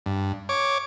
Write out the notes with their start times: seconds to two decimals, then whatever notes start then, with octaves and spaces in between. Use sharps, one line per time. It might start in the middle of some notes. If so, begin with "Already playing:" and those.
0.06 G2
0.49 C#5 D6